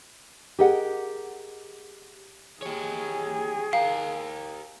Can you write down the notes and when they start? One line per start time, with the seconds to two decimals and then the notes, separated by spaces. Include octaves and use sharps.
0.59 G4 G#4 A#4 D#5 F#5
2.62 G4 G#4 C#5
3.73 G4 A#4 F5